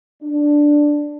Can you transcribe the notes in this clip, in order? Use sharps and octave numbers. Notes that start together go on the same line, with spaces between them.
D4